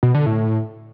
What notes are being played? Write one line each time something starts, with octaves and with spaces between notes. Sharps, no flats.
B2
D3
A2